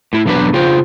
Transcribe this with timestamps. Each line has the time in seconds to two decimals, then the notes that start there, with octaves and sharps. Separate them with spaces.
0.13 A2 E4
0.26 B1 E2 F#3 D4 B4 B5
0.53 C#3 F4 C5 G5